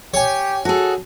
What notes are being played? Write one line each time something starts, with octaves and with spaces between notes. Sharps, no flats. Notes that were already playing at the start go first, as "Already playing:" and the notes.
G4 C#5 G#5
F#4 G#4 A4